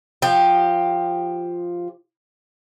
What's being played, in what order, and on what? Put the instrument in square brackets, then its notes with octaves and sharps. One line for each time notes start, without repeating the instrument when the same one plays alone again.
[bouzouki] F3 G4